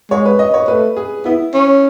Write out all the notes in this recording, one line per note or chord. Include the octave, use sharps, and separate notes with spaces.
G#3 C#5
B4
D#5
C#5
A3 B4
G#4
B3 E4
C#4